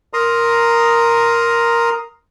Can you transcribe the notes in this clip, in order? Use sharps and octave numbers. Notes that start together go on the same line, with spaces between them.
A#4 A#5 C6 D#6